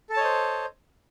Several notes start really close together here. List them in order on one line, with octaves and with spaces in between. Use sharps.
A4 A5 C#5 D#5 C5